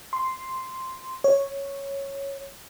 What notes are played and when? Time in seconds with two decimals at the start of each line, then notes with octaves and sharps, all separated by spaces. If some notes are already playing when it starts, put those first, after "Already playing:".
0.13 C6
1.24 C#5